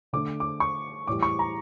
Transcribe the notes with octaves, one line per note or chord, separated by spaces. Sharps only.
D3 A3 D4 D6
D6
C#6
A2 E3 G3 D6
C#6
A#5